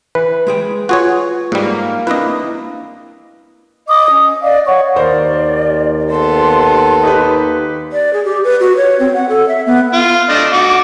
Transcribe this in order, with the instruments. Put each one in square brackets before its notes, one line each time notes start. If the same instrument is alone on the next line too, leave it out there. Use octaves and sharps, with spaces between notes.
[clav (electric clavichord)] E3 [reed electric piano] B4
[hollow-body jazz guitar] G#3 G#4 G5
[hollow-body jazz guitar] F4 [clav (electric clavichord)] F#4 G#4 C#5
[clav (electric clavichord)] G#2 G3 [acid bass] A#3
[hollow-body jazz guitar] C4 D4 E4 [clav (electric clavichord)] B4 D#5
[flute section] D#5 D6 D#6
C#4
D5 D#5 F5
C#5 F#5 C#6
[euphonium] D#2 [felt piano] A#4 C5 [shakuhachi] D5
[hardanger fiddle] B3 A4 [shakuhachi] C6
[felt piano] D#4 G4 B4
[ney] D5
G#4
G4
B4
F#4
C#5
C4
F#5
A4
E5
B3
[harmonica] F4
A3 D4 D#5
F#4 D6